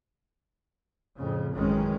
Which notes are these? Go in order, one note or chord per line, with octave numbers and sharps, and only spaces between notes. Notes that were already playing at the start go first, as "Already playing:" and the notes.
F2 A2 C#3
A1 F#2 D#3 G#3 C#4